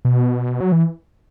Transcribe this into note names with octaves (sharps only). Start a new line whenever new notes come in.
B2
F#3
E3